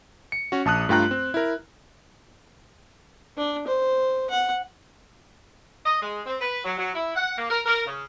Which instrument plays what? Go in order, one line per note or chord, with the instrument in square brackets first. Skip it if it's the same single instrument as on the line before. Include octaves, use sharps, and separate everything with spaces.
[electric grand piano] C#7
C#4 F#4
A#1 A5 D#6 F#6
G2 A3 F4 G5 A#5 F#6
C4
E4 A#4
[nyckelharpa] D4
C5
F#5
[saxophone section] D#5
G#3
C4
B4
F#3
F#3
E4
F#5
A#3
A#4
A#4
C#3